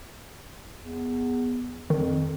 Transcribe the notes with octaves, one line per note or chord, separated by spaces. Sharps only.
E2
F2 D#3